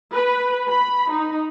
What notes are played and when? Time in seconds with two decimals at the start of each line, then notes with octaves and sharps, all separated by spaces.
0.13 B4
0.70 B5
1.11 D#4